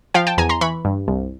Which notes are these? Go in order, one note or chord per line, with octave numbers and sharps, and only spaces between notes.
F3 F5 G5
G5 A5
E2 G#5 A#5
A#5 C6
E3 B5 C#6
G2
C2